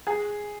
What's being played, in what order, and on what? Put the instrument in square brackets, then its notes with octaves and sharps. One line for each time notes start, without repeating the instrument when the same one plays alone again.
[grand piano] G#4